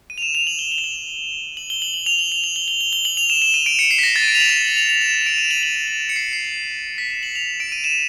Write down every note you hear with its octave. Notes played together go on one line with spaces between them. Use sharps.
D#7
F7
E7
F7
F#7
G7
G7
F7
F#7
F#7
F#7
G7
F#7
F#7
F7
F#7
F7
F#7
G7
G7
G7
G7
F#7
F7
E7
E7
D#7
D7
C#7
C7
B6
A#6
A6
D#7
D7
F7
F#7
F#7
F#7
F7
F7
E7
D7
D#7
F#7
F#7
F#7
F7
C#7
C7
C7
B6
E7
F#7
F7
D7
D#7
E7